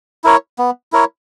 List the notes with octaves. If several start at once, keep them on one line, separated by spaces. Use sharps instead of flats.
E4 A#4 C#5
B3
E4 A#4 C#5